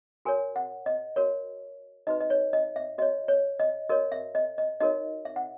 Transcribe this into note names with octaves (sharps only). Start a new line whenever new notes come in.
F#4 A#4 C#5 G#5
F#5
D#5
F#4 A#4 C#5
D#4 F#4 B4 D#5
D#5
C#5
D#5
E5
F#4 C#5 D#5
C#5
D#5
F#4 A#4 C#5 D#5
E5
D#5
D#5
D#4 F#4 A#4 C#5 D#5
E5
F#5